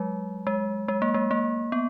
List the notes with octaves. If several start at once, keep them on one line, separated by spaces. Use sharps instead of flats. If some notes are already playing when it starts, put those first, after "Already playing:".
Already playing: F#3 G#3
G#3
G#3
A#3
G#3
A#3
B3